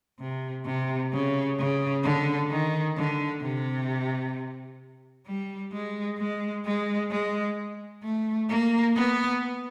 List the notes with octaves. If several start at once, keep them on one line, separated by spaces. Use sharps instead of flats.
C3
C3
C#3
C#3
D3
D#3
D3
C3
G3
G#3
G#3
G#3
G#3
A3
A#3
B3